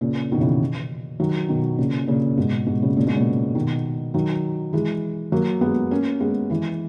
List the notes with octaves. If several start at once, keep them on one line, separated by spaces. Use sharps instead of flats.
A#2 C#3
B2 D#3
C#3 E3
D#3 F#3
B2 D#3
A#2 C#3
A#2 C#3
G#2 B2
G#2 B2
A#2 C#3
A#2 C#3
G#2 B2
A#2 C#3
B2 D#3
D#3 F#3
E3 G#3
F#3 A#3
G#3 B3
A#3 C#4
G#3 B3
E3 G#3